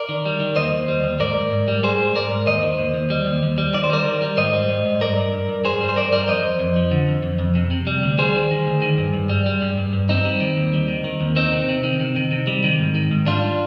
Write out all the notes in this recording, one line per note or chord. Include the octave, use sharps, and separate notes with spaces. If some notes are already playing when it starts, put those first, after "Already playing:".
Already playing: A#4 D5
D#3
G3
D#3
D#2 C5 D#5
D#2
G3
D#2
G#2 A#4 D5
G#2
G#2
G3
G3 G#4 C5
G#2
G#2 A#4 D5
G#2
D#2 C5 D#5
D#3
D#2
D#2
G3
D#2
D#2
G3
D#3 D5
C5
G3 A#4 D5
D#3
G3
G#2 C5 D#5
G3
G#2
G#2
G2 A#4 D5
G2
G2
G2
G2 G#4 C5
G3
C5
G2 A#4 D5
G3 A#4 D5
F2 C5 D#5
F2
F2
F3
D3
F2
F2
F2
C3
C3
G3
D2
G3 G#4 C5
D#3
D#3
D2
D#3
G2
G2
G3
G3
G2
G2
G2
G3 C4 D#4
G3
D#3
D#2
G3
D#3
D#3
D#2
D#3 C4 D#4
C3
C3
D#3
C3
D#3
C3
G3
D#3
G#2
D#3
G#2
G3 D4 F4